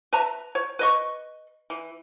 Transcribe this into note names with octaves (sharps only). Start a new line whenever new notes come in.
B4 E5 A5 A#5
C#5
B4 D#5 C#6
E3